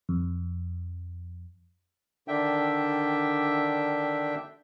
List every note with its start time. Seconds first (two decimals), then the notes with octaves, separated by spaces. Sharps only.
0.09 F2
2.28 D3 D#3 D4 E5 G5